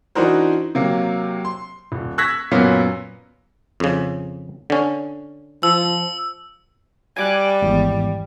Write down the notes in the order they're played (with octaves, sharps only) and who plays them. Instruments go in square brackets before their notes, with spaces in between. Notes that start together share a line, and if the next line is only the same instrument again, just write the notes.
[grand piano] E3 D4 D#4 F#4 A#4 C5
C3 F#3 A#3
C6
D#1
C#6 E6 F#6 G#6 A#6 B6
F#2 A#2 F#3 B3 C#4
[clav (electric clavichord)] F2 C#3
D3 C#4
[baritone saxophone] F3 [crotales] E6
[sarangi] G3 [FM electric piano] G#5 D6 F#6
[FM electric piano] G#1 E2